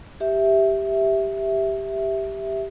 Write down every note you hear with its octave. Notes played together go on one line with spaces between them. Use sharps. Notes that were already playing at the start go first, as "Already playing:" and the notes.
G4 E5